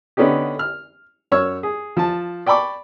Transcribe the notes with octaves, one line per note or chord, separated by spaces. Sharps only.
D3 B3 C#4 D#4 G4
F6
F#2 C#5 E6 F6
G#4
F3 A5
D5 G5 A5 B5 C#6 D6